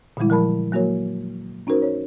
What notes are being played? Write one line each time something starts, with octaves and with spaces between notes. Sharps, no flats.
A#2 D3 E3 G3 G#3 E4
F3 A#4 A5 B5
F#3 A#3 F#4 A#4 C#5
C#4 D#4 F#4 A#4 C5
C#5